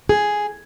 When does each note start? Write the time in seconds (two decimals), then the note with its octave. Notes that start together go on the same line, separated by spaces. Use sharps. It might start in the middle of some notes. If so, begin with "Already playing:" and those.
0.09 G#4